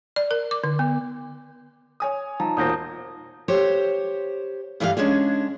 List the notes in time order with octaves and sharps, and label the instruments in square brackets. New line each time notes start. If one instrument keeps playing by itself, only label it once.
[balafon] D5
A#4
D6
D3
B3
[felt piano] C#5 G#5 D#6
[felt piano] F3 [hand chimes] D#4 A5 A#5
[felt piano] E1 A#2 C5 [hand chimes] D#6 G6 A#6
[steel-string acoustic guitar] G4 C5 C#5
G2 E3 G3 G4 F5
G#3 C#4 D4 G#4